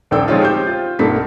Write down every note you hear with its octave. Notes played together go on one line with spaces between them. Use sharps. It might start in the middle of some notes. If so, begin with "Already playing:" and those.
D#1 A#1 D4 A4 G5 E6
F3 G#3 C4 C#4 D#4 F4
G4 C5 G6
F4
B1 G2 A#3 A4 B6